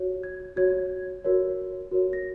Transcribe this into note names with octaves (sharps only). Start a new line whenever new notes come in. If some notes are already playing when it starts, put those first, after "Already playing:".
Already playing: F#4 C#5
G#6
F#4 C#5 G#6
F#4 A#4 C#5
F#4 A#4 C#5
A#6